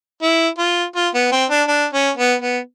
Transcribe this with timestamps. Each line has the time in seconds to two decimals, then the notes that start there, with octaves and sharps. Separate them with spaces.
0.23 E4
0.58 F4
0.96 F4
1.14 B3
1.32 C4
1.50 D4
1.68 D4
1.93 C#4
2.17 B3
2.42 B3